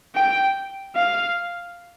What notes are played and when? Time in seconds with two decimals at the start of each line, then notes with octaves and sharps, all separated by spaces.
0.15 G5
0.96 F5